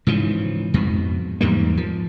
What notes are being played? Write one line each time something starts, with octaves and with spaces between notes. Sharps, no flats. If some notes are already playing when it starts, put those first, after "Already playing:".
G#2 C#3 E3 F3
F2 G#2 B2
E2 G#2 G3 A#3
F3